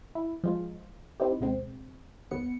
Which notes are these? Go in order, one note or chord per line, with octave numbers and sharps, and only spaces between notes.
E4
F3 G#3 F4
C4 D#4 E4 G4
D2 B2 G#3 C4
G1 D#2 B3 C#7